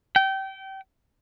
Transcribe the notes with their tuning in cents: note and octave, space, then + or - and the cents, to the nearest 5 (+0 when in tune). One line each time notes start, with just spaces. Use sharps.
G5 -25